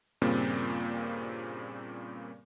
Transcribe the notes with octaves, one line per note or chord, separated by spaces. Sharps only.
G2 A#2 C#3 A#3 C4